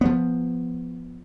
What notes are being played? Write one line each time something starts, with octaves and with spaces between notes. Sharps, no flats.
F3 B3